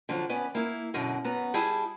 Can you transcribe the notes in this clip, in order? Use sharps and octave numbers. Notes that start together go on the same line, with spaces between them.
D3 F3 F#3
B3 C#4 B4 D5
A#3 E4
F#2 B2 D3
F#2 B3 A#5
G3 E4 G#4 A5